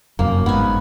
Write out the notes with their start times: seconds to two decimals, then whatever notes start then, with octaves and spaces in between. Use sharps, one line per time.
0.19 F1 F#2 A#3
0.46 G1 G#2 B3 G#5